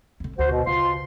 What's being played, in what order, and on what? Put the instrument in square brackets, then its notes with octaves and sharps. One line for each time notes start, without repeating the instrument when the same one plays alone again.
[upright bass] D3 C4
[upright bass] D2 [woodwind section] F#4 C5
[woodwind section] B2
[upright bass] C#3 [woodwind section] F4 C6